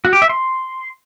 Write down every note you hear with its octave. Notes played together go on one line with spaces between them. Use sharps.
F#4
G4
E5
C6